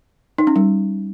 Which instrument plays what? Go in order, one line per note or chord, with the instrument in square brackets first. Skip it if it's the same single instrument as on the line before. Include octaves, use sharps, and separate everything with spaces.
[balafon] D#4
C#4
G3